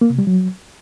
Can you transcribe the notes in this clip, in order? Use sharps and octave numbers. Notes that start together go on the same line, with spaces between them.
A#3
C3
G3
F#3